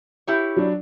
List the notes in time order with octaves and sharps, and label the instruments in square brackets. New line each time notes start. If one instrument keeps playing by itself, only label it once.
[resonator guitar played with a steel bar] E4 G4 C#5
[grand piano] F#3 D4 D5